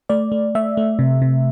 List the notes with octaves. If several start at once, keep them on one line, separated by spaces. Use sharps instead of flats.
A3 D5
A3
A3 E5
A3
C3
C3